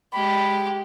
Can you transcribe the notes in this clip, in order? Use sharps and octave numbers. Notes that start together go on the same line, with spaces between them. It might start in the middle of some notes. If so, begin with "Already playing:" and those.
G#3 G4 B5